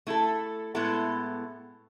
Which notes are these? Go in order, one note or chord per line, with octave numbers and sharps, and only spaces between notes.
A3 E4 A4
A2 G#3 B3 E4 A4